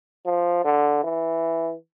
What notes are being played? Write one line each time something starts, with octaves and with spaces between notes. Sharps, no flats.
F3
D3
E3